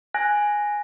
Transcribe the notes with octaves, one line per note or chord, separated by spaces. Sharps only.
G#5 F#6 A#6